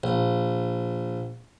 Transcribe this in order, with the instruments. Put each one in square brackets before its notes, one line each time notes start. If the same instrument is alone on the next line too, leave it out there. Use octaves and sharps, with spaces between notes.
[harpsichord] A#1